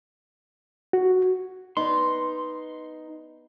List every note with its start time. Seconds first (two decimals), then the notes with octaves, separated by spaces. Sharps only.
0.93 F#4
1.77 B3 D#4 C6